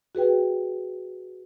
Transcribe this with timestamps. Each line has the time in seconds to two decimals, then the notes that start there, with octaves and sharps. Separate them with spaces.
0.15 F#4 G#4 B4 G5